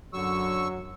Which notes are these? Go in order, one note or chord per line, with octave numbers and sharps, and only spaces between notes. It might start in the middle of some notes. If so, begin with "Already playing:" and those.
F#2 D3 F#3 C#6 E6